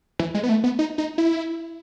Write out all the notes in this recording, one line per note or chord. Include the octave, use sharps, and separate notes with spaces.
E3
G#3
B3
A3
B3
D#4
D#4
E4